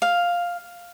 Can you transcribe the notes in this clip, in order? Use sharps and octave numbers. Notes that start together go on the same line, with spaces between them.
F5